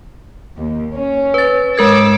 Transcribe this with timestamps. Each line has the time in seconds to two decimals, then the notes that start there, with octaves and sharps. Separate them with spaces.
0.57 D#2
0.93 C#4
1.34 B4 A6
1.77 G#2 G#3 A#4 D6 E6 G#6